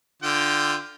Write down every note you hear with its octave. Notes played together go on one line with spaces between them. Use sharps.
D3 F4 G5